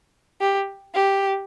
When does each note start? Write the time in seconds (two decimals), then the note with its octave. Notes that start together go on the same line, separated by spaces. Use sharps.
0.41 G4
0.95 G4